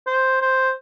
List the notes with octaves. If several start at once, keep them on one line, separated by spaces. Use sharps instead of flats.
C5
C5